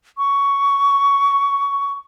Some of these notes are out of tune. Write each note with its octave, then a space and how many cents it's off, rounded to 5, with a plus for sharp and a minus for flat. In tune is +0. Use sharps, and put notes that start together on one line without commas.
C#6 +15